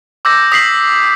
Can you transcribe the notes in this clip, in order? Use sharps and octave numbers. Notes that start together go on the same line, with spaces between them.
D6 E6 G6 A#6
D#6 B6 C7 F#7